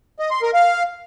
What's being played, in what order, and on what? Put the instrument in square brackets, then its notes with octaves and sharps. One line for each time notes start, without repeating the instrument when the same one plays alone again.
[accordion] D#5
C6
A#4
F5